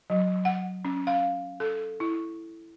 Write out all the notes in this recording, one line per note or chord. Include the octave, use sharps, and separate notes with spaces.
F#3
F#5
C#4
F5
A4
E4